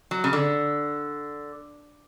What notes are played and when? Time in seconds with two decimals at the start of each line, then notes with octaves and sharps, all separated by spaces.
0.11 F#3
0.24 C#3
0.33 D3